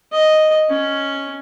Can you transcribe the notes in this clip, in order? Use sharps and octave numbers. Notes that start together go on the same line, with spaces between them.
D#5
C#4